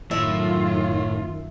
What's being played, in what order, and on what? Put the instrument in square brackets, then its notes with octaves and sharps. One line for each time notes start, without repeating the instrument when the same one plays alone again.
[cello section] F#2 F4 [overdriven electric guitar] A2 [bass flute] D#3 [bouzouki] E5